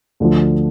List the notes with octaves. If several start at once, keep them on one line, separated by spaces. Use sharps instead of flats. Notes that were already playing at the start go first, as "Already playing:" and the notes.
D2 D3 F3